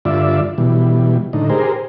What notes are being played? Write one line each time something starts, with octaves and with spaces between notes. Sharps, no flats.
G2 D3 F4 D5 E5
B2 E3 G3
A2 D3 D#4
G4 G#4 A#4 C5